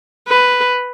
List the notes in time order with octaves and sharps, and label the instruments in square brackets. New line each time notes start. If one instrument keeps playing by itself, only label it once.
[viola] B4